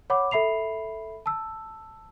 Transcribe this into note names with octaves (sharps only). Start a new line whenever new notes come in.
C#5 F#5 B5 D6
A4 E5 B5 C7 F7
A5 E6